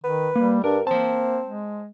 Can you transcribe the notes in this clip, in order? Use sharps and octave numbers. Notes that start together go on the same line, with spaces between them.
D#3 B4
G3 A#3
G2 D4 A#4
A#3 C4 C5 A5
G#3